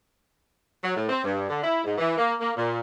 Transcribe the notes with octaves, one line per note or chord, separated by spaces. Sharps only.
F#3
A2
C4
G2
D3
E4
G#2
E3
A#3
A#3
A#2